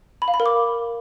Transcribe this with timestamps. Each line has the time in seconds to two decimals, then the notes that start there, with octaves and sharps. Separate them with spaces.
0.22 B5
0.28 F5
0.34 B5
0.40 A#4
0.46 D6